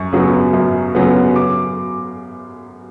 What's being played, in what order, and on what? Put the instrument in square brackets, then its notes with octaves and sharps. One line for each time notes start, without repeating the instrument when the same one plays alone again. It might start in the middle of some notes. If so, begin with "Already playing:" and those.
Already playing: [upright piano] F#2 C#6
C#3 F#3 B3
F#2
C#3 F#3 B3
D6